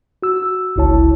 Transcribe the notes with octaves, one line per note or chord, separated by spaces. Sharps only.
F#4 E6
G1 C#2 E4 C#5 A5